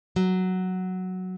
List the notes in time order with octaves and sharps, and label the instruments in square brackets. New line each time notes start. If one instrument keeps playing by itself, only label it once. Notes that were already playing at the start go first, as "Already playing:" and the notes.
[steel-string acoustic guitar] F#3